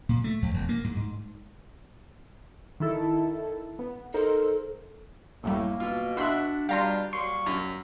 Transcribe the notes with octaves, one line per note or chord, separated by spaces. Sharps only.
A#2
A3
F2
E1
A#3
G#2
G#2
D#3 E4 A4
B3
D#4 A4 A#4 C5
A1 F#2 A2 G3 A#3
B2 F4
D4 F#4 E5 B5 C6 F#6
B2 G3 D4 F4 G4 F5 A#5 C6
F#3 G3 A#3 C6 C#6
F#2